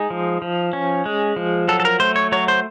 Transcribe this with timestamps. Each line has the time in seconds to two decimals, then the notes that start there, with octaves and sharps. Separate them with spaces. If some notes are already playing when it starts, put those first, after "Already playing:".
Already playing: G#3 D#4
0.10 F3
0.42 F3
0.73 C#4
1.06 G#3
1.36 F3
1.68 F#3 A4
1.80 A4
1.85 A#4
2.00 A3 C5
2.16 C#5
2.32 F#3 C#5
2.48 C5